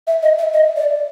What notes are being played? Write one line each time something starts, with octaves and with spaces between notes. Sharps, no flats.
E5
D#5
E5
D#5
D5